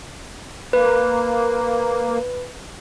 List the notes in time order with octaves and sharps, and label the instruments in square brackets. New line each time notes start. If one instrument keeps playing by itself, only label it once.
[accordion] A#3 [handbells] B4